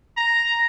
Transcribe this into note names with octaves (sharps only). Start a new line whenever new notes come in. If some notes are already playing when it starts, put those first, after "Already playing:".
A#5